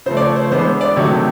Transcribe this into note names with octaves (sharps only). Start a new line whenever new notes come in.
C#3 F3 A3 C5
D5
C#5
C5
E3 G#3 B3 D4 C5
D5
C3 D#3 F#3 A3 C#5